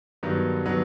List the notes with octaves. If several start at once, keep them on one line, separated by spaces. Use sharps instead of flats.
G2 D#3 F#3 B3
D#3 F#3 B3